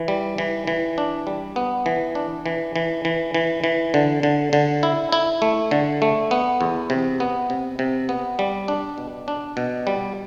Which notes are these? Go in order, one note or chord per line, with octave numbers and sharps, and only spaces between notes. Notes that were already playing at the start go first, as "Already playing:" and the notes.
Already playing: E3
G3
E3
E3
D4
G3
B3
E3
D4
E3
E3
E3
E3
E3
D3
D3
D3
E4
E4
A3
D3
A3
B3
E2
C3
B3
C3
C3
B3
G3
D4
B2
D4
B2
G3